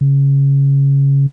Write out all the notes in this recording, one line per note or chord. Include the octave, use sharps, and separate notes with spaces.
C#3